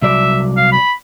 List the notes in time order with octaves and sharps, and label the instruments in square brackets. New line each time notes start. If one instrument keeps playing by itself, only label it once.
[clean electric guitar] C2 F#3 D5 [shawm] E5
[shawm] F5
B5